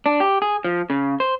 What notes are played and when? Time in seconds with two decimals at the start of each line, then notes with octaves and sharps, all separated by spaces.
0.06 D4
0.20 G4
0.42 G#4
0.64 F3
0.90 C#3
1.20 C5